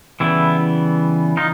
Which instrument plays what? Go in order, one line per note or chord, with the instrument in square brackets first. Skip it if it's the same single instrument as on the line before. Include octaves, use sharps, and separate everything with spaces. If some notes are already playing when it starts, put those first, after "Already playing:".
[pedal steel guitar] C#3 E3 G3 B3 E4
D#4 F4